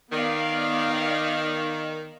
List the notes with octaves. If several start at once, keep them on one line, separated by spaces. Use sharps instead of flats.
D#3 B3 D5 F5